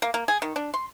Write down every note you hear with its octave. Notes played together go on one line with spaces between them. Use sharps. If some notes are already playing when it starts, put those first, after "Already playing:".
A#3
A#3
G#4
D#3
D4
C6